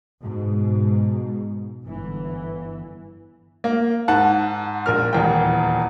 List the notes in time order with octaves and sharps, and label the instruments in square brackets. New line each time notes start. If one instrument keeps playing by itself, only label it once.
[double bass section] G#2 B2
G1 E3
[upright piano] A#3
G#2 F#5 A5 F#6
A#1 A#4 F6
D#1 E2 G5